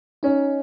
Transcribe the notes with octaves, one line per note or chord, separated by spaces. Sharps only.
C#4 D#4